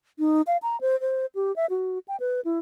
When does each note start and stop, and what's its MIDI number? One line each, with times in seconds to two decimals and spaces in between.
0.19 0.42 63
0.47 0.57 77
0.63 0.79 82
0.81 0.99 72
1.01 1.26 72
1.35 1.54 67
1.56 1.66 76
1.70 1.99 66
2.08 2.16 79
2.20 2.41 71
2.45 2.59 64